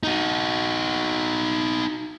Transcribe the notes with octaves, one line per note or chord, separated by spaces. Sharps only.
D#4 F#4